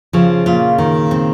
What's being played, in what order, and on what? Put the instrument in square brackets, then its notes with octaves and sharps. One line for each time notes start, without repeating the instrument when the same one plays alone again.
[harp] C#3 [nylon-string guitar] F3
[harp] A#2 [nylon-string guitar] F4
[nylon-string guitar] D#3
C4